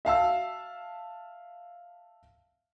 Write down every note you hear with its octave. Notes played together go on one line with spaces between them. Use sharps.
E5 F5 A5 E6